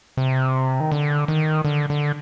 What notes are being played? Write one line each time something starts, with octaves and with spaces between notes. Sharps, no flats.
C3
D#3
D3
D#3
D3
D3